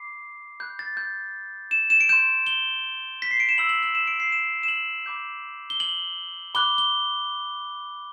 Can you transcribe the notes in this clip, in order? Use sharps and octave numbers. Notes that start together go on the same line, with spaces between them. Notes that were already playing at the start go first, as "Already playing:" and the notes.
Already playing: B5 D6 C7
B5 F#6 G6
A6
G6
E7
E7
D7
C6 G6 E7
G7
B6
C7
D7
E7
B5 E6 G6 F#7
F#7
F#7
E7
D7
C7
E7
E7
F#7
B5 D6 G6
G7
F#7
B5 D6 F#6 G7
G7